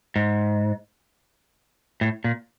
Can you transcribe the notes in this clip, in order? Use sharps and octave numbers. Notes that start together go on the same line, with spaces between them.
G#2
A2
A#2